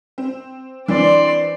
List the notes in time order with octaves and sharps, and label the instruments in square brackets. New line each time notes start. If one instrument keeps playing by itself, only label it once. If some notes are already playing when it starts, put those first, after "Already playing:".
[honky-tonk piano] C4
[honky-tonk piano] E3 C4 D4 [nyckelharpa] D5 C6